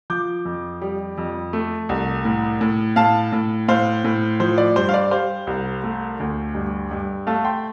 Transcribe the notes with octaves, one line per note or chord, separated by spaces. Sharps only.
F3 D6 G6
F2
G3
F2
A3
C2
A2
A2
A2 F5 A5
A2
A2 C5 F5
A2
F3 C5
D5
G2 C5
F5
D5
G3 C5 F5
C2
A3
D2
G2
G2
A3 F5 A5
G5 C6